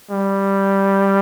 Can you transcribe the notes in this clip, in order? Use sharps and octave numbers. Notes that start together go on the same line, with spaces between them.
G3